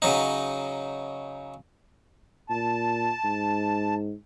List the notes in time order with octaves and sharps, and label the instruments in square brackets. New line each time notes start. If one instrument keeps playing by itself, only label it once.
[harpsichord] C#3 F#3 D#4
[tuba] A#2 [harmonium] A5
[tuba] G#2